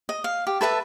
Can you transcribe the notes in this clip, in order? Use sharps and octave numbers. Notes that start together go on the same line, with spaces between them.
D#5
F5
G4
A4 B4 E5 A5